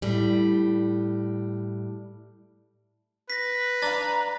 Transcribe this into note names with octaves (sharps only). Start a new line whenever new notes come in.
A2 G3
B4 A#6 B6
D4 F5 A#5 A6